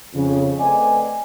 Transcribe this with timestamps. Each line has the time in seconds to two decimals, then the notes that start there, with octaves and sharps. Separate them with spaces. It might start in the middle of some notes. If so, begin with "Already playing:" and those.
0.14 F2 C#3
0.59 A3 C4 B4 D5 D#5 G#5